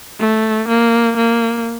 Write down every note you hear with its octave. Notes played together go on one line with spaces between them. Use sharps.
A3
A#3
A#3